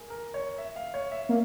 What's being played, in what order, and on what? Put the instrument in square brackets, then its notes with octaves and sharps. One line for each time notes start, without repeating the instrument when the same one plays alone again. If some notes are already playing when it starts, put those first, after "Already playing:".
Already playing: [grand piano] G#4 A#4
A#4
C#5
E5
F5
C#5
E5
[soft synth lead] A#3